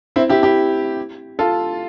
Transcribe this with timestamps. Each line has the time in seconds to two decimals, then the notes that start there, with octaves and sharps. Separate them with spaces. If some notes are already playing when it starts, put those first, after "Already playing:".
0.16 C4 E4
0.29 E4 G4
0.43 E4 G4
1.39 F4 A4